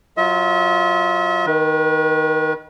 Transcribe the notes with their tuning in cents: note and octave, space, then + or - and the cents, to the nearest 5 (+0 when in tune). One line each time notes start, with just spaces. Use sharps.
F#3 +0 F4 +0 E5 -45
D#3 +0 B4 -40